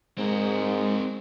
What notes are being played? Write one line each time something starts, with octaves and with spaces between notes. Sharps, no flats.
G#2 G#3 C4 A#4